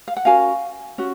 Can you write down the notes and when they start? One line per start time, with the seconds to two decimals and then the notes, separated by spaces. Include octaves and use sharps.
0.08 F5
0.16 F#5
0.25 C#4 F#4 A#4 F5 G#5
0.98 C#4 F#4